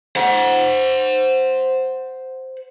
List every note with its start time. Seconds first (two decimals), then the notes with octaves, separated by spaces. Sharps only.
0.16 C5 F#5